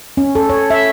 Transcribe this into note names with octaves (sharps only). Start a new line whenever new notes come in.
C#4
A4
C#5
E5